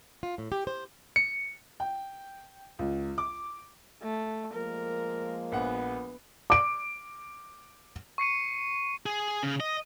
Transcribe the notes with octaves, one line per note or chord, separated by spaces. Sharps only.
F4
A2
G4
C5
C#7
G5
C#2
D6
A3
F3 G#3 A#3 A#4
A#1 B3 F#5
D6 D7
C#6 C7 C#7 D#7
G#4
C#3
D#5